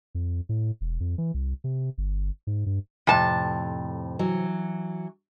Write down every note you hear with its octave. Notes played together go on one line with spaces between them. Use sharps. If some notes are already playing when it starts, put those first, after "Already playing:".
F2
A2
E1
F2
E3
C2
C3
G1
G#2
G2
F2 A2 C3 A5
E3 F#3